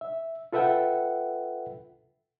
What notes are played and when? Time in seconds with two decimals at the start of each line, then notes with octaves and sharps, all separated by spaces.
0.01 E5
0.53 F4 A4 B4 E5 F#5 G5